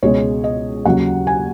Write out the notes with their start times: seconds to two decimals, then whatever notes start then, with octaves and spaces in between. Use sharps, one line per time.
0.02 C#2 B2 G#3 C#5
0.44 D#5
0.85 D#2 C#3 F#3 F#5
1.27 G#5